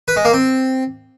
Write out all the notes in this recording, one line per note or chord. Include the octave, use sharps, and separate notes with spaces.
B4
G#3
A#3
C4